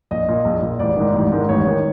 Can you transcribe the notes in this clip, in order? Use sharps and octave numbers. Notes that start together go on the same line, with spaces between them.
A#1 D#5
A#2
A#1
A#2
A1 D5
G#2 D#3
A1
G#2 D#3
A1 C#5
D#3